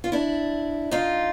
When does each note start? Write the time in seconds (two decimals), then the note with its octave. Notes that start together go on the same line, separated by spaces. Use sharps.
0.04 F4
0.12 D4 E4
0.91 D#4 F4